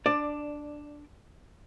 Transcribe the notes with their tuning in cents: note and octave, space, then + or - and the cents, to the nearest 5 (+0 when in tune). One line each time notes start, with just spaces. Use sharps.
D4 +0 D5 +15